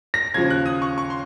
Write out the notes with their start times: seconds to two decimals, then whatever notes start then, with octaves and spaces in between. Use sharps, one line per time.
0.14 A#6
0.34 D#2 C#3 F3 G#6
0.50 F#6
0.66 D#6
0.82 C#6
0.98 C#6
1.10 C6